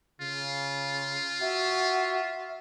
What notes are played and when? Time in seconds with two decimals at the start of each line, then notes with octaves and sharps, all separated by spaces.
0.21 C#3 F4
1.41 F#4 E5